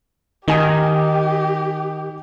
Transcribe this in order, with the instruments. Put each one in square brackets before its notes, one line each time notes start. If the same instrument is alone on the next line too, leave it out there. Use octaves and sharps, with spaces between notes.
[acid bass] D#3 [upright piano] D#4 G#5 D#6 [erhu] G4